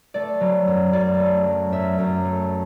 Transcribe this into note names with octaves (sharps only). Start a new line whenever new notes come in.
A3 D5
F#3
F#2
F#2 D5
A3
F#3
F#2 E5
F#2
A3